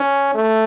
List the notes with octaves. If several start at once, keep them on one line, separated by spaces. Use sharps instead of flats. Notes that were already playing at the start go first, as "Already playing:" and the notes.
Already playing: C#4
A3